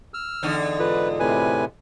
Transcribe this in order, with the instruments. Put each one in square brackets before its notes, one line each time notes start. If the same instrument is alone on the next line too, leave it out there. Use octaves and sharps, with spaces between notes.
[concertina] E6 F6
[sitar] E2 D3 D#4
[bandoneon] G#2 [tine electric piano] F4 A4 D#5 [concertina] B4
[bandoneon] A2 C3 [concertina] B4 G#5